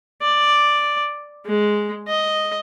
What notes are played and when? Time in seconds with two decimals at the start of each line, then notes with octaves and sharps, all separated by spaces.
0.22 D5
1.46 G#3
2.08 D#5